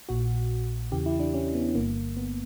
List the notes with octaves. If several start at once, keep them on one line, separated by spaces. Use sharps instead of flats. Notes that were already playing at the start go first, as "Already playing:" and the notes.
A#1 A#2 F#4
E2 C#3 E3 G4
E4
D4
C#4
B3
G1 G2 D3 A#3
B3